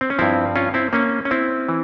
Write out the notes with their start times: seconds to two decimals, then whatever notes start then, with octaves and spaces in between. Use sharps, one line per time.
0.01 C4
0.10 C#4
0.18 G2 F3 C4 E4
0.56 C#4 F4
0.74 C4 E4
0.93 A#3 C#4
1.25 C#4
1.31 C4 E4
1.69 E3